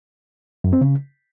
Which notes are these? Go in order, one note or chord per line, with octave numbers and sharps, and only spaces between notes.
F#2
C4
C#3